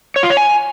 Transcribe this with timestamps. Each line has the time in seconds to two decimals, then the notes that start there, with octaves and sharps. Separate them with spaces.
0.16 C#5
0.23 F4
0.30 C#5
0.37 G#5